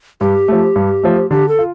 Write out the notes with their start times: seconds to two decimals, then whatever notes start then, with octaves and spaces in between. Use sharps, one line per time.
0.21 G2 G4
0.48 F3 A3
0.76 G2
1.03 F3 A3
1.31 D3 G4
1.48 A4
1.59 F4